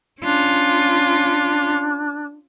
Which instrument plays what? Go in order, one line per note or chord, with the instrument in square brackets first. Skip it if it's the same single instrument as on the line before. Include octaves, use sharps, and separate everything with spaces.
[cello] C#4 F4 [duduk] D4